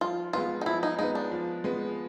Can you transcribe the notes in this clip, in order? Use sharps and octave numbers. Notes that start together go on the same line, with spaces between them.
F3 F4
G#3 B3 F4
D#4
F3 E4
D#4
G#3 B3 D#4
D4
F3
G#3 B3